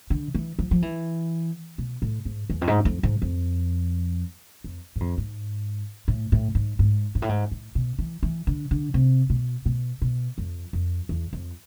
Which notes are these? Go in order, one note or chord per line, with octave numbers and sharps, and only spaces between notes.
D3
E3
F3
F3
E3
B2
A2
G#2
E2
F2
G#2
F2
G#2
F2
F2
G#2
F2
G#2
A2
A2
G#2
G#2
G#2
A2
G#2
A2
B2
E3
E3
D3
D3
C3
B2
B2
B2
F2
F2
E2
F2